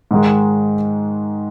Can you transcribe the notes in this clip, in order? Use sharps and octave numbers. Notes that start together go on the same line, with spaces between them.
G#2 D#3 G#3